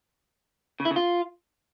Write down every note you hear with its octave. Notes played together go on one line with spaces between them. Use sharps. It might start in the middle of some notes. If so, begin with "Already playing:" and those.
C#3
E4
C#3
F4